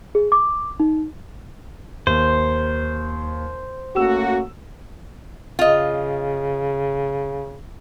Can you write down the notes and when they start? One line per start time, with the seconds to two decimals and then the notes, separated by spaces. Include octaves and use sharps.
0.15 G#4
0.32 D6
0.80 D#4
2.07 D#2 C5
3.96 A3 A#3 C#4 F#4 E6 E7
5.59 C#3 F4 D#5